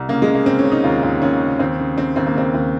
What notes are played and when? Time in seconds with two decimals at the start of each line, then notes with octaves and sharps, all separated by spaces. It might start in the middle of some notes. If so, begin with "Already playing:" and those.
Already playing: C2
0.09 C#3 A#3
0.22 G#3
0.28 C#3
0.35 A#3
0.46 C#3 C4
0.59 C#4
0.65 C#3
0.72 D#4
0.84 D#2 F4
1.03 D#2
1.22 D#2 C#4
1.41 C#3
1.59 D#2 C4
1.79 C#3
1.97 C#3 C4
2.16 D#2 C4
2.27 A#3
2.35 C#3 C4
2.54 D#2